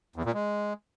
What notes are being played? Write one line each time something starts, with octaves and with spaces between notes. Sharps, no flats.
E2
A#2
G#3